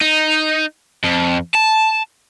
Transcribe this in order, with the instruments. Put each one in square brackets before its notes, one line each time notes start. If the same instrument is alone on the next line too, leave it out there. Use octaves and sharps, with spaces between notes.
[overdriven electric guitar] D#4
F2
A5